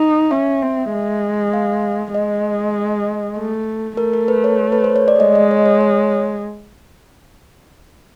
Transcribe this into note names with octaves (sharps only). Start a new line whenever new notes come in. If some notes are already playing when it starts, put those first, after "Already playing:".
Already playing: D#4
C#4 E5
C4
G#3
F5
G#3 D#5
A3
A3 A#4
A#4
B4
C#5
B4
C5
C#5
D5
G#3 D#5
D#5
C#5
C#5
C#5